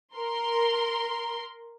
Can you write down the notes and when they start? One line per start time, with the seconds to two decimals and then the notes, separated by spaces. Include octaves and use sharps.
0.17 A#4 C6